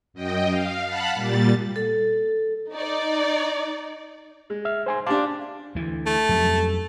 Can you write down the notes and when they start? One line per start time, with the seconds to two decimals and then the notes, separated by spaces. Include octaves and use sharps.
0.14 F#2 D#5 G5
0.48 F5
0.85 F5 F#5 A5 B5 F#6
1.14 A#2 G3 A6
1.76 A4
2.72 D#4 D5
4.50 G#3
4.65 E5 F6
4.86 C5 G#5 C6
5.06 D4 G4 F5 A5 C6 D6
5.75 D2 E3
6.06 A3
6.29 F2 F#3 G3